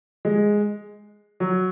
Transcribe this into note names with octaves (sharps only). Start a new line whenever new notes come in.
G#3
F#3